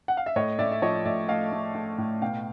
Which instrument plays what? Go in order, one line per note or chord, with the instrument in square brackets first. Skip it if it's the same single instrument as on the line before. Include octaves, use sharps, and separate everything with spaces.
[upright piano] F#5
F5
E5
A2 C#5 D#5
A2 D5 E5
E5
F3 C#5 D#5
A2 D5 E5
A3 D#5 F5
A3
A3
A2
B2 F5 G5